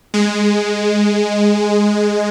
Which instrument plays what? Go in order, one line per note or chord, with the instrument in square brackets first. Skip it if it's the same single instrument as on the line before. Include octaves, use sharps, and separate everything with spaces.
[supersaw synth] G#3